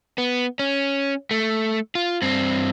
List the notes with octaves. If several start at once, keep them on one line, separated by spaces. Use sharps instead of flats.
B3
C#4
A3
F4
G2 C4